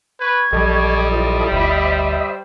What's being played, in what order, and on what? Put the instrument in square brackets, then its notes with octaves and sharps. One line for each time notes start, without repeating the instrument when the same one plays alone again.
[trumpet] B4 [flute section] C#6 G#6
[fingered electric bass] A#1 F#3 [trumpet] G3 [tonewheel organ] A4 D#5
[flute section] E4 F4 C5
[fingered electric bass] G1 D2 [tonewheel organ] D#5 E5 B5
[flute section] C5